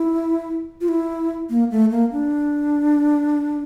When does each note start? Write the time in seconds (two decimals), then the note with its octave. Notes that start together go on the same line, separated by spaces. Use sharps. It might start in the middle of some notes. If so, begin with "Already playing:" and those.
Already playing: E4
0.81 F4
0.88 E4
1.50 A#3
1.71 A3
1.91 A#3
2.12 D4